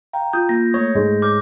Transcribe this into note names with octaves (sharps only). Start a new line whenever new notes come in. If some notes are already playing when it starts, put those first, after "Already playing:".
F5 G5 A#5
F4 D#6 G6
A#3 A#6
A3 C#5
G#2 G#3
C#5 D6 F6 G6 A#6